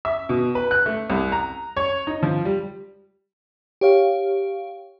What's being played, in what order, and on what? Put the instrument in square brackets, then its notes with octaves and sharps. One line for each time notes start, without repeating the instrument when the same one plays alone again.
[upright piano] E5
B2
B4
F#6
A3
C2
A#5
C#5
D#4
F3
G3
[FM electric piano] G4 C#5 F5